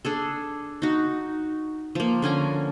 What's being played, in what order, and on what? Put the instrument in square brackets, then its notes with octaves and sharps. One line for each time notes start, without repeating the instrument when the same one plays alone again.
[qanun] D4 G#4 A4
D#4 F#4
F3 A#3
D3 C#4 G#5 A#5